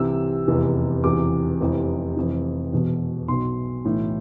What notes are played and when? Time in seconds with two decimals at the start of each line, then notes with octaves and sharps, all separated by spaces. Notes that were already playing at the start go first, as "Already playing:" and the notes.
Already playing: C2 C3 E3 E6
0.48 F1 E2 C3 E3
1.04 E1 E2 C3 E3 D6
1.60 F1 F2 C3 E3
2.16 F1 F2 E3
2.72 E1 E2 B2
3.28 B1 B2 C6
3.85 B1 A2 E3